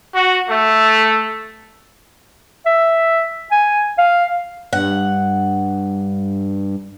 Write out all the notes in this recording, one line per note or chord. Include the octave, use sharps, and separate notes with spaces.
F#4
A3
E5
G#5
F5
G2 F#5